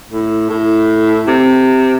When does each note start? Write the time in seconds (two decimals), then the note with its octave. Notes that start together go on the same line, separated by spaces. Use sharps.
0.11 A2
0.50 A2
1.28 C3